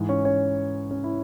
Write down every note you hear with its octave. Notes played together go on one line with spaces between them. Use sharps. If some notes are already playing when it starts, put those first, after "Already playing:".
Already playing: G#2 E3
C#4 C#5
C#4 C#5
C#4 C#5
E4